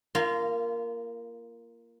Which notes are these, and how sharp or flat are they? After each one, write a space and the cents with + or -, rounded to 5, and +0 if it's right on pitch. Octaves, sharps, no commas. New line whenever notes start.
A#3 +0 F4 -25